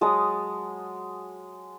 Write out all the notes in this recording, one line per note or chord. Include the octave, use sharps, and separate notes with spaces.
F#3 G#3 A5 D#6